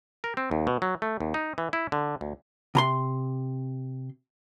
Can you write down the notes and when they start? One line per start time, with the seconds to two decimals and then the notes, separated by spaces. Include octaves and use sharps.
0.24 A#4
0.37 C4
0.51 D#2
0.67 B2
0.82 F#3
1.02 A3
1.20 D#2
1.34 D#4
1.58 E3
1.73 E4
1.92 D3
2.21 D2
2.75 C3 A#5 C6